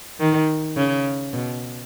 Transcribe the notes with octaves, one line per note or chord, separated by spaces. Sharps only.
D#3
C#3
B2